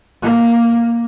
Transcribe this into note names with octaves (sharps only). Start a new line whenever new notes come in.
A#3